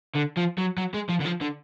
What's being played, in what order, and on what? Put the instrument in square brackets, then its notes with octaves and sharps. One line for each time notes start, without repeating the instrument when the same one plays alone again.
[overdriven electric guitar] D3
F3
F#3
F#3
G#3
F3
D3
F3
D3